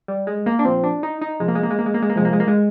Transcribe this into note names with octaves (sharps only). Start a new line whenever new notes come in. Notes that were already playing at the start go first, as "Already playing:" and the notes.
G3
G#3
A#3
D4
A#2 F3 C4
D4
D#4
D#4
C3 F3 G#3
A#3
G#3
A#3
G#3
A#3
G#3
A#3
G#3
A#3
C3 F3 G#3
A#3
G#3
A#3
G#3